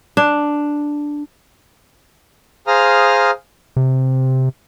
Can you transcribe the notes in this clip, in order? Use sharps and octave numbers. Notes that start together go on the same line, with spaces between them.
D4
G#4 C5 F5 A#5 D#6 F6
C3